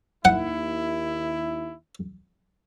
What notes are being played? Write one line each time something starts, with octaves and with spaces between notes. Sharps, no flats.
D#2 E4 F#5